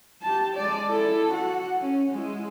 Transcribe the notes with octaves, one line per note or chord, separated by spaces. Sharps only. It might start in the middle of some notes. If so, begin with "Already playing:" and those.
G4 A5
G#3 D5
E4 A4
F#4 F#5
C#4
G#3 E4